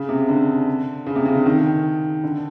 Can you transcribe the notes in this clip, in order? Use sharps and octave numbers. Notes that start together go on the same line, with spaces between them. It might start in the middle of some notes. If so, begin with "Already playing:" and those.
Already playing: C#3
C3
D3
C#3
C3
C#3
D3
D#3
D3